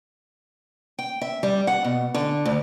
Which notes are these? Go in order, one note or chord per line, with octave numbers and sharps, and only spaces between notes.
G5
E5
G3
F#5
B2
D3
D2